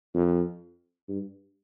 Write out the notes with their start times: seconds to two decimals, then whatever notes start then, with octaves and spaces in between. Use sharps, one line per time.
0.14 F2
1.09 G2